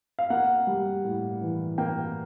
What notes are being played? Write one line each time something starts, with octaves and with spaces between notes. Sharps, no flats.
F5
A#3 F#5
G3
A2
E3
A#3 G5